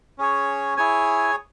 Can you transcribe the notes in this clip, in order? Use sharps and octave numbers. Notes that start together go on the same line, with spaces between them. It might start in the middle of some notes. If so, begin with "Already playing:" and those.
C#4 G#4 C#5
E4 G#4 C#5 G#5